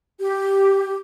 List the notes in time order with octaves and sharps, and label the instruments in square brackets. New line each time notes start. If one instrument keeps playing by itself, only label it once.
[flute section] G4